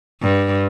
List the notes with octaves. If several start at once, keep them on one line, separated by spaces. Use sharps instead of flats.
G2